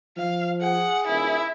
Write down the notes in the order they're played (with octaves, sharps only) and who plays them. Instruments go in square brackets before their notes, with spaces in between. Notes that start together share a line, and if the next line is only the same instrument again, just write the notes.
[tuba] F3 [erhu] F5
[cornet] G#4 [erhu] F#5
[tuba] D#1 [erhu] E4